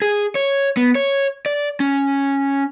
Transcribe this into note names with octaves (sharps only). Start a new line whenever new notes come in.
G#4
C#5
B3
C#5
D5
C#4